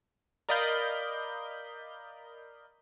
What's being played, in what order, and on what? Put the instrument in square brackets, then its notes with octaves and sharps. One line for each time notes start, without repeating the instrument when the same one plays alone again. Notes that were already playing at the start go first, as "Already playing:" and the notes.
[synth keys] A#4 D5 D#5 F5 B5 G6